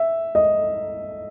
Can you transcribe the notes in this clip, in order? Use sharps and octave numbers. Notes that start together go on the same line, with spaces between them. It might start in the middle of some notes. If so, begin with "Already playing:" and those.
Already playing: E5
D#5